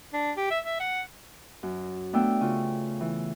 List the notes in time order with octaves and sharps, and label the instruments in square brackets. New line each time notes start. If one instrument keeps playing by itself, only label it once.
[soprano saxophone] D4
G4
E5
E5
F#5
[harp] F#2
A3 B3 D4 G5 E6
C#3 F4
E3